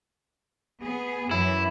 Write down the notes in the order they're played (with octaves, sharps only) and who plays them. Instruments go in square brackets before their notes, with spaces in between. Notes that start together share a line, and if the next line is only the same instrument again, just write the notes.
[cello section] B3 G#4
[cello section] F#2 E3 [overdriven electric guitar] E4